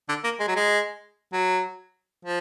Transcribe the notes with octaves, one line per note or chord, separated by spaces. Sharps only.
D3
A#3
G#3
F#3
G#3
F#3
F3